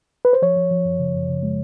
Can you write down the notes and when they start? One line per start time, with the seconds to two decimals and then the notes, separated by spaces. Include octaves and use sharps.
0.25 B4
0.33 C5
0.42 F3 C#5
0.57 F3
0.71 F3
0.85 F#2
0.99 C#3
1.14 F#2
1.28 C#3
1.43 G#3